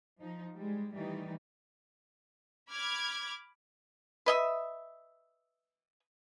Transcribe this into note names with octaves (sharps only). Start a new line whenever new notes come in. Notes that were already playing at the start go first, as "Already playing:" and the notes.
F3 D#4
G3 G#3
A2 D#3 E3 G3 D#4
B5 D6 F6 G#6
B4 D#5 E5